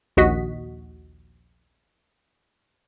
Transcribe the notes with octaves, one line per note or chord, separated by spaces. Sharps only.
A#1 D#2 F#4 D#5 B6